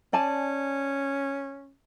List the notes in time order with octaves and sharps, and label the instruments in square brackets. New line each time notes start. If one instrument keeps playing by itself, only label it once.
[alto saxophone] C#4 [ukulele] D5 G#5 A5